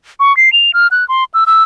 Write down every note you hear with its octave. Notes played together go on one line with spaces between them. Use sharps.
C#6
C7
F7
F6
F#6
C6
E6
E6